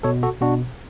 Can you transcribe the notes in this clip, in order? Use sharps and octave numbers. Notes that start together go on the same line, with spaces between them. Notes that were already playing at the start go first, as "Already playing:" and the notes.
B2 A4 C#5
F#4 A4
B2 D4 F#4